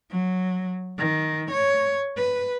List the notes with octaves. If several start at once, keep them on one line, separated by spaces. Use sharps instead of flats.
F#3
D#3
C#5
B4